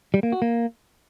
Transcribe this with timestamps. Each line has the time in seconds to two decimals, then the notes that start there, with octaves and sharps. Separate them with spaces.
0.14 G3
0.23 A#3
0.32 F#4
0.42 A#3